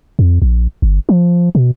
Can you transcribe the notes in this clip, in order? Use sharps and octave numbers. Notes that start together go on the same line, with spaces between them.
F2
A#1
G1
F3
B2